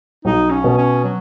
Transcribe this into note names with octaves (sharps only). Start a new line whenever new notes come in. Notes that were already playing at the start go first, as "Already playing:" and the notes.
B1 D#4
C#4
B2
C#4
F#3